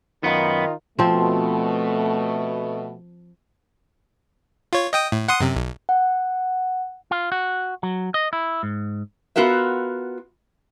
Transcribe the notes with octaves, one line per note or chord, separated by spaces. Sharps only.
F#2 D#3 B3 D#4 F4
B2 F3 A3 C4
F4 C#5
D#5 G5 D#6
A2
F#5 C6 D#6
F#2 C3
B1
F#5
F4
F#4
F#3
D#5
E4
G#2
B3 F4 F#4 A#4 E5